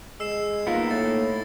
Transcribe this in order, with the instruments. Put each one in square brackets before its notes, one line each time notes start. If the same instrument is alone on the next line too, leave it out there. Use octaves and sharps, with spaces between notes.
[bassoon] G#3 [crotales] E6 C7 E7
[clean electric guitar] A#3 D#4 F#5 [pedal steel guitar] B3 A#4 [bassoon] F4
[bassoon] A2 [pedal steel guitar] A3 E4 [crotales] A6